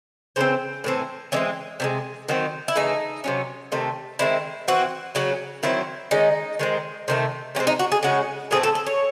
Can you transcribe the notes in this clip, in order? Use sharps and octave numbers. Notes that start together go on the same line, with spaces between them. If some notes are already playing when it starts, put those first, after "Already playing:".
C#3 E3 C4 C5
A2 E3 C4
E3 G#3 C4 C#4
C3 E3 G#3
D#3 F#3 C4
E4
C#3 E3 A3 D#4
C3 F#3 C#4
C3 D#3 A3
D#3 G#3 C4 E4
E3 C4 F#4
C#3 F#3 C#4 F#4
D#3 F#3 C4 E4
D#3 G#3 C#4 D#4
D#3 G#3 C4
C3 D#3 A3
C3 E3 G#3 C4 C#4
D#4
F#4
G#4
C#3 G#3 C#4 F#4
A2 E3 A3 C4 G#4
A4
A4
C#5